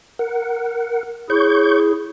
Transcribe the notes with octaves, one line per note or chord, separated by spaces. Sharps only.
A#4 F#5
E4 G#4 C#5 C#6 G6